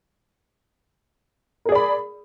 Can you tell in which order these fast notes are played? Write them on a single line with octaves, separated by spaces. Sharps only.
A#4 G#4 D5 B5